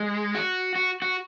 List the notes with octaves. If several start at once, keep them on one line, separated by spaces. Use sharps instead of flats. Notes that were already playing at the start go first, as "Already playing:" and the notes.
Already playing: G#3
F#4
F#4
F#4